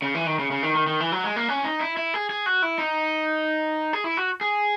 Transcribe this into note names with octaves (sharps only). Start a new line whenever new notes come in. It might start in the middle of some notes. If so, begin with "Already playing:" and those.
C#3
E3
D#3
C#3
C#3
D#3
D#3
D#3
E3
F#3
G#3
A#3
C#4
D#4
E4
E4
G#4
G#4
F#4
E4
D#4
G#4
E4
F#4
G#4